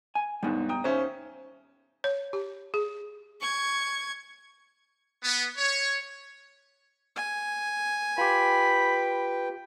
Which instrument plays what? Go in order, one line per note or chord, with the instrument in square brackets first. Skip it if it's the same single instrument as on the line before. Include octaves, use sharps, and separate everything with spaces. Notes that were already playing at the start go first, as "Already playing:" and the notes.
[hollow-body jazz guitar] G#5
[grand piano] D#2 G#2 [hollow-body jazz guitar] G3 B3 D4
[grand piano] G5 A#5 D#6
[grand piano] D#2 C#4 E5 [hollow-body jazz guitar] C5
[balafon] C#5
G4
G#4
[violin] C#6 G#6
[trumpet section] B3
C#5
[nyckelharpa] G#5
[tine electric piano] F4 G4 [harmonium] B4 G5 [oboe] B5